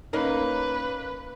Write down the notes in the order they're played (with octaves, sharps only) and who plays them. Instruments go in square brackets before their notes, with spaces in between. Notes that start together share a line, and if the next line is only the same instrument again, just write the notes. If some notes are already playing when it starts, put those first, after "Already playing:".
[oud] A#3 C#4 D#4 [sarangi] B4